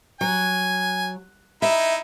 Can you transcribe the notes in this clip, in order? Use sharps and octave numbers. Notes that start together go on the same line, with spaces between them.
F#3 G#5
D#4 E4 E5